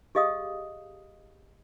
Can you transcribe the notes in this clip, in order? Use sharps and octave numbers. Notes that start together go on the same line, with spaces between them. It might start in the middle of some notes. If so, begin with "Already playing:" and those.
G4 G#4 D#5 F5 D#6